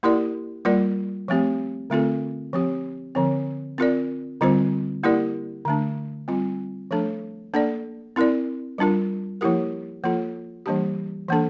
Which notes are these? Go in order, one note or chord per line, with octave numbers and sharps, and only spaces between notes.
A#3 E4 G4 A#4 D5
G3 A#3 F4 A#4 D5
F3 A3 C4 G4
D3 A3 C4 F4 A4
F3 C4 G4
D3 F3 C4
C4 F4 A#4 D5
D3 G3 C4 F4 C5
A#3 E4 G4 A#4 D5
D3 A3 D4
G3 C4 F4
F3 A3 D4 A4
A#3 D4 A4 D5
C4 E4 A#4 D5
G3 D4 F4 A#4
F3 A#3 E4 G4 A#4
F3 A#3 F4 A4
E3 G3 A#3 D4 G4
E3 A#3 D4 A4